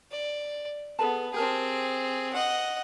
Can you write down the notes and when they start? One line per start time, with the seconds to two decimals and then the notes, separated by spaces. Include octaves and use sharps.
0.12 D5
0.99 B3 G#4 A4 A5
1.34 C4 G4 G#4 A#4 A5
2.33 D#5 F#5